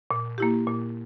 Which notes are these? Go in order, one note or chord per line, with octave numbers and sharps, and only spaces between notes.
A#2
A#3 E4 G4
A#2